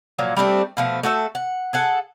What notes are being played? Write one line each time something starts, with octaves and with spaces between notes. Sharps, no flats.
A#2 F3 F#3
G3 A3 C4 D4
B2 F3 A3
A3 F#4 A4 E5
F#5
G#4 A4 F#5